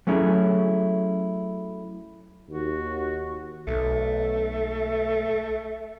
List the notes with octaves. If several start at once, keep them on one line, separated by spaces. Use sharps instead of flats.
F#3 A3 C#4 E4 G#4
D#2 F#4
B1 A3